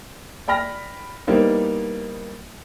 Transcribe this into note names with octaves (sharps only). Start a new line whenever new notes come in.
D5 G5 B5 F6 A#6
G3 A#3 B3 D#4 E4 C5